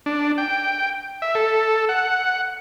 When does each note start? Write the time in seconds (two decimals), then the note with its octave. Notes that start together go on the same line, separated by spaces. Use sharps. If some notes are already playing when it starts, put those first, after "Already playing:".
0.06 D4
0.38 G5
1.22 E5
1.35 A4
1.89 F#5